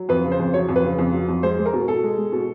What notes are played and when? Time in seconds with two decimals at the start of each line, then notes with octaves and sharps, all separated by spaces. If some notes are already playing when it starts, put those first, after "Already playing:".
Already playing: F#3
0.09 F2 B4
0.24 C#3
0.32 C5
0.39 F2
0.54 F#3 C#5
0.69 F2
0.76 B4
0.84 C#3
0.99 F2
1.13 F#3
1.29 F2
1.43 G#3 C5
1.58 G#3
1.66 A#4
1.73 B2
1.88 B2 A4
2.03 G#3
2.17 G#3
2.32 B2